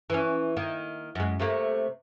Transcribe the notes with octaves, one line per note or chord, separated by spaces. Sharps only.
E3 C#4
D#3 A#3
F#2 G#3
C3 A3 A#3